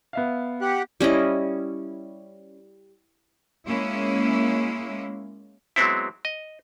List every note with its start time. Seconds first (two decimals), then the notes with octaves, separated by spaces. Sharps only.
0.13 B3 E5 F5
0.61 G4 F#5
1.00 G3 C#4 E4 D#5
3.66 G#3 A#3 C#4 E4
5.76 F#3 G#3 B3 C4 E4
6.25 D#5